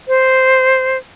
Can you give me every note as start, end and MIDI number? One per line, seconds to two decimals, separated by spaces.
0.08 0.97 72